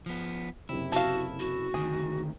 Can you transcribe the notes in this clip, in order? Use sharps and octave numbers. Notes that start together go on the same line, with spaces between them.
F3 B3
F#1 C3 E4
F#4 A4 F5
F#4
D2 D#3 G#4